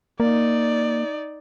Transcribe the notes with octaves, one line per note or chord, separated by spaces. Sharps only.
A#3 D#4 D5